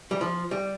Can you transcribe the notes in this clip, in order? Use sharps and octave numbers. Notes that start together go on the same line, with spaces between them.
G3
F3
G3